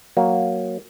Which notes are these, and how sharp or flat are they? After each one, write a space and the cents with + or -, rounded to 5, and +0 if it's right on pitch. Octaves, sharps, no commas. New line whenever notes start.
F#3 +0 A#3 +0